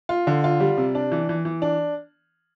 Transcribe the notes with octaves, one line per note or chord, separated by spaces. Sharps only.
F4
D3
F4
G3
C3
D4
E3
E3
E3
D4